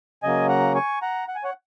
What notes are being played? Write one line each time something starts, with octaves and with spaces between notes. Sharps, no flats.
C#3 F#3 A#3 D#5 G#5
F#5 A#5
G#5 C#6
F#5 A#5
F#5
G#5
C#5 F#5